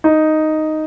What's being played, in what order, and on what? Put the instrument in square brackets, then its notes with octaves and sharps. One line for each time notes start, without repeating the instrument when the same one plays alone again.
[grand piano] D#4